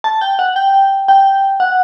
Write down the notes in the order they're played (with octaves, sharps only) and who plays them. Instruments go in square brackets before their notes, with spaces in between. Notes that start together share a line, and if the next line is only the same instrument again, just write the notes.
[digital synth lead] A5
G5
F#5
G5
G5
F#5